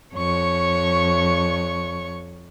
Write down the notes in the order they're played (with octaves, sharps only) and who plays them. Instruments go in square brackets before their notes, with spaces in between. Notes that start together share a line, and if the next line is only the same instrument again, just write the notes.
[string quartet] F2 C#5 C#6